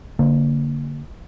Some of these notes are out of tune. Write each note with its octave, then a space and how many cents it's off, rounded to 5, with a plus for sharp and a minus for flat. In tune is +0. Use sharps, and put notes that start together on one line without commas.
D3 -20 A#3 -15